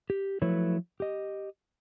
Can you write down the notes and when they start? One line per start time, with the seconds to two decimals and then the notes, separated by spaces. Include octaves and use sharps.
0.10 G4
0.42 F3 F#3 A3 E4 B4 C#5
1.00 G4 D#5